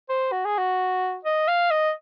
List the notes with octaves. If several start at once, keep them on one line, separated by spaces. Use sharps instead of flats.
C5
F#4
G#4
F#4
D#5
F5
D#5